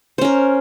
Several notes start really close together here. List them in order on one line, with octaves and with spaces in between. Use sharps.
C5 C#4 A#4